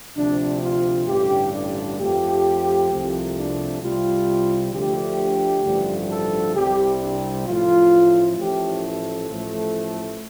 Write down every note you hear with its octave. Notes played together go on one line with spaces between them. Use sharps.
D2 C3 F3 D4
F4
A1 G2 D3 G4
D4
F2 F3 A3 G4
C2 C3 F3 A3
D4
C2 C3 G3 F4
D2 D3 F3 A3 G4
A1 G2 D3 F3 A3
A4
C2 C3 G3 G4
D4
A1 A2 F3 A3 F4
A1 A2 F3 A3 G4
A4
A1 A2 F3 A3